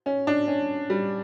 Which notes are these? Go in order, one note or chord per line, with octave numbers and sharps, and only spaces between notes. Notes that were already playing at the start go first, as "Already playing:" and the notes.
C#4
D4
C#4
G3